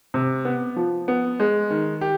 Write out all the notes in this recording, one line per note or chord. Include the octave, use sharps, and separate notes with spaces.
C3
B3
F3
B3
G#3
D#3
G4